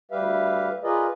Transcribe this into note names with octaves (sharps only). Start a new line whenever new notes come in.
D2 G3 G4 B4 E5 F5
F4 G#4 A#4 B4 D5 D#5